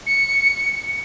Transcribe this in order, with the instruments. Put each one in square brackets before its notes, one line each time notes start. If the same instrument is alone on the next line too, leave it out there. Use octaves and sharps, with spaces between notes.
[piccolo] C#7